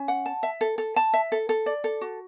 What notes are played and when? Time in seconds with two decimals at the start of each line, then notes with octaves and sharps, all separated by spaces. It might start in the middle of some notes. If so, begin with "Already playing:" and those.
Already playing: C#4
0.08 F#5
0.26 A5
0.43 E5
0.61 A4
0.78 A4
0.96 A5
1.13 E5
1.32 A4
1.49 A4
1.66 D5
1.84 A4
2.01 F#4